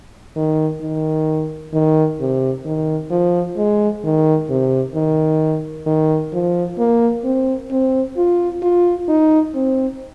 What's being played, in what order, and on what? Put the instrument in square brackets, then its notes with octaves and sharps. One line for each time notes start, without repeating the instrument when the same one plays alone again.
[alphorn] D#3
D#3
D#3
C3
D#3
F3
G#3
D#3
C3
D#3
D#3
F3
A#3
C4
C4
F4
F4
D#4
C4